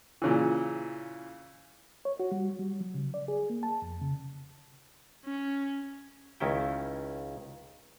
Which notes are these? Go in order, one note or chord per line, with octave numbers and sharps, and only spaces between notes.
A#2 C#3 E3
C#5
F#4
G3
G3
F#3
C#3
D5
G#4
A#3
A5
F2
C#3
C#4
C#2 D#3 C#4 E4 G5